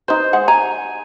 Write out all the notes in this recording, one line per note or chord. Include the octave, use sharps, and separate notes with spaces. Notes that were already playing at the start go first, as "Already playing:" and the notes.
D#4 B4 C5
G#3 G#4 F#5
G#5 A#5